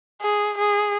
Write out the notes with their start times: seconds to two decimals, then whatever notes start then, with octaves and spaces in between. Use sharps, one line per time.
0.22 G#4
0.58 G#4